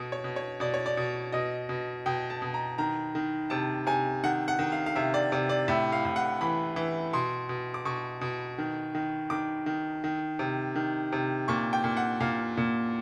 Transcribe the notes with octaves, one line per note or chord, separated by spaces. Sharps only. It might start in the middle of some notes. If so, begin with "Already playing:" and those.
Already playing: B2
C#5
B2
C#5
B2 D5
C#5
D5
B2
B2 D#5
B2
B2 G5
A5
B2
A#5
D#3 A#5
D#3
C3 A5
C3 G#5
D#3 F#5
F#5
D#3
F5
F5
C3 E5
D5
C3 D5
D5
A2 E5
F5
A2
F#5
E3 B5
E3
B2 C6
B2
D6
B2 C#6
B2
D#3
D#3
D#3 D6
D#3
D#3
C3
D#3
C3
A#2 C#6
G5
A#2
F#5
A#2 F5
A#2